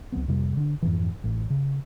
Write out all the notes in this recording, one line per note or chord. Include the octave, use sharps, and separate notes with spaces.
C#2 F#3 B3 C4
F2 C3 G3
D3 D4
F2 G#2 E3
A1
C#3